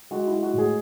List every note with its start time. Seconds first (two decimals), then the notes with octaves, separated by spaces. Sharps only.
0.11 G#3 F#4
0.27 G#3 E4
0.43 F#4
0.54 A2 G#4